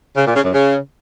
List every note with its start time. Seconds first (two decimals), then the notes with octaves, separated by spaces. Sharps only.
0.17 C#3
0.26 A#2
0.35 C#3
0.44 F#2
0.54 C#3